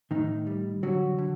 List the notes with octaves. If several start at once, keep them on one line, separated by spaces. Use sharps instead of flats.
A2 D#3 D#4
G3
D3 F#3 F#4
D3